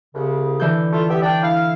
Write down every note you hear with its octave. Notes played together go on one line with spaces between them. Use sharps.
C2 C#3
D3 E3 G6
A3 F4
B3 G4 E5
D4 D5 G5
E4 F5